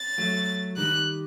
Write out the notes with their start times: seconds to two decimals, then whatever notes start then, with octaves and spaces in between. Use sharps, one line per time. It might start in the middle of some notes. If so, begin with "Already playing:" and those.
Already playing: A6
0.18 F#3 A3
0.77 D#3 G3 F#6